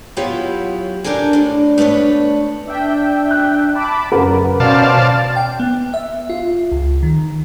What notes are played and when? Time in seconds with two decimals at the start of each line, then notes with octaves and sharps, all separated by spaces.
0.17 F#3 B3 E4 F4 G4 C#5
1.04 D4 G4 A4 A#4 G#5
1.33 A2 D4
1.78 A3 B3 D4 B4 C#5
2.66 D4 E5 G5
3.31 F#6
3.74 A5 B5 D6
4.12 F#2 C#3 A#4 B4 F#5
4.60 B2 C#4 C5 D5 F5 A5
5.36 G5
5.60 B3
5.94 E5
6.30 F4
6.72 C#2
7.03 D#3